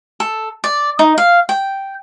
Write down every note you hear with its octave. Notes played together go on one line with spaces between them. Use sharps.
A4
D5
D#4
F5
G5